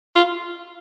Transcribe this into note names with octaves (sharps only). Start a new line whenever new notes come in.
F4